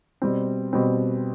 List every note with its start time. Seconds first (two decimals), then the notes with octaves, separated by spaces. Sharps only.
0.22 B2 G3 C4
0.73 B2 G3 C4